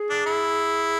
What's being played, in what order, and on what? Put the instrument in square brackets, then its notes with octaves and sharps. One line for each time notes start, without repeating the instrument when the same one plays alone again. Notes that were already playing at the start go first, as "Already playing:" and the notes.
Already playing: [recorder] G#4
[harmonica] D4
E4